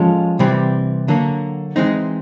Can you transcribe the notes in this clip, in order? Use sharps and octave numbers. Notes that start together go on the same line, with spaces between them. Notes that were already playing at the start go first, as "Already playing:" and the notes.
Already playing: F3 G#3 C#4 F4 A4
C3 E3 G3 C4
D3 F#3 A#3
E3 G#3 C4 D#4